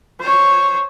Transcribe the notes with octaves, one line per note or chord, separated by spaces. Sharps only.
C5 C#5